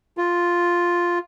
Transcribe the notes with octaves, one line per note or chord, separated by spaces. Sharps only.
F4